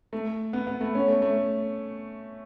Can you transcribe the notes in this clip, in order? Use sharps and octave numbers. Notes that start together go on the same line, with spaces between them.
A3
B3
B3
A3
C#4
A3
A3